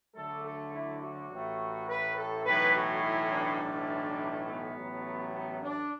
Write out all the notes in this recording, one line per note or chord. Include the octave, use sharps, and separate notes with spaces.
D2 D3 F#3 A3 A4
A4
E4
F#4
A1 A2 A3
B4
A4
B1 A2 E3 A3 B4
F#4
E4
D4
B1 A2 E3 A3
B3
A1 A2 F#3 A3
B3
D4